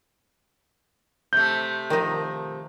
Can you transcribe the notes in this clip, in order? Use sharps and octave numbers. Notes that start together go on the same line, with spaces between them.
C3 A3 G6
D#3 F3 D#4